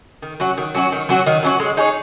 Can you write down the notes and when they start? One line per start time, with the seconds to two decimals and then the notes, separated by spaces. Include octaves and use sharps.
0.22 D#3
0.40 F#3 C#4 F#4
0.57 D#3
0.75 F#3 C#4 F#4
0.92 D#3
1.09 F#3 C#4 F#4
1.26 D#3
1.43 F#3 C#4 F#4
1.60 G#3
1.77 D#4 G#4 C#5